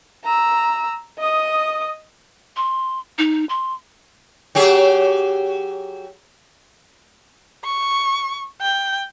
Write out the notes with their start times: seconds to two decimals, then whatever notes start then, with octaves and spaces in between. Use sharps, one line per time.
0.24 A#5 E6
1.19 D#5 D#6
2.56 C6
3.18 D#4
3.49 C6
4.55 F#3 G4 G#4
7.64 C#6
8.61 G5